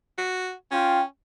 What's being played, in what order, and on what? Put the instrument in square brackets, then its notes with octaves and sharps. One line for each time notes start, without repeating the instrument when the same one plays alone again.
[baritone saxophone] F#4
[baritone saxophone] C#4 [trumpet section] F4 G5